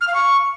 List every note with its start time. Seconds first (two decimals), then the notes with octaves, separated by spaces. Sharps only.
0.01 F6
0.08 F5
0.14 C#6